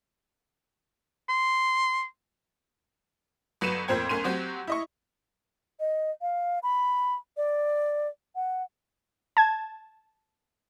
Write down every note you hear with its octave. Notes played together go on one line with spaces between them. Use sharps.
C6
G1 F#3 B4 C#7 D#7 E7
F2 A#2 C4 C5 G5 G#6
B1 C#4 A#4 C6 D#7
F#3 C4 F#4 G4
E4 D#5 C#6
D#5
F5
B5
D5
F#5
A5 G#6